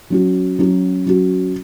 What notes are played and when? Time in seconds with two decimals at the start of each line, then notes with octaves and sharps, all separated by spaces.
0.10 F#3 C#4 F#4
0.59 F#3 C#4 F#4
1.06 F#3 C#4 F#4